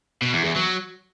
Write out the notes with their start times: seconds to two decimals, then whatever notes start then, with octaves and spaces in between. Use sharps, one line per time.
0.22 B2
0.33 E2
0.44 E2
0.56 F#3